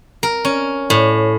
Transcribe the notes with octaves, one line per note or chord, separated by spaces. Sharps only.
A#4
C#4
A2